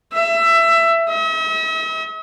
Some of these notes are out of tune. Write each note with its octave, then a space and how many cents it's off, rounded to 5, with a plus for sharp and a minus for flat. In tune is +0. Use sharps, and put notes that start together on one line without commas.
E5 +20
E5 -45